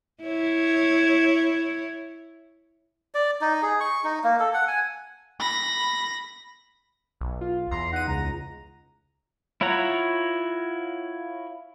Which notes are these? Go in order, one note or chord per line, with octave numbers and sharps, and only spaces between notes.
E4 C#5
D5
D#4
G#4
C#6
D#4
A#3
A4
F#5
G#5
B5 A#6
B1
F4
E2 A#5 C6
D#4 F#5 D#7
C#2 A#5
E4 F4 C#5 F#5 A#5